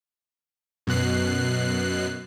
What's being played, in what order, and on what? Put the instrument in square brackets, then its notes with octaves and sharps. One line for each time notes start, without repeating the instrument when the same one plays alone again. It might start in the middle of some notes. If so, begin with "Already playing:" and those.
[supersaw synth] F#2 B2 F#6 C7